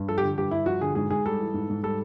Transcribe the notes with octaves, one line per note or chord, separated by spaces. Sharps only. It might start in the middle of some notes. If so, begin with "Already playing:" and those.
Already playing: G2
F3 A4
G4
D3
G2 G4
G2 E4
F3 F#4
D3 G#4
G#2 G#4
G#2 G#4
G3 A4
E3
G#2
G#2
G3 A4